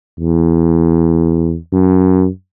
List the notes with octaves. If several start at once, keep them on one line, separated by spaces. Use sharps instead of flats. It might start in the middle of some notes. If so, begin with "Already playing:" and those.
E2
F#2